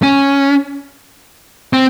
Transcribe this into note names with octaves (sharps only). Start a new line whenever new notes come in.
C#4
C4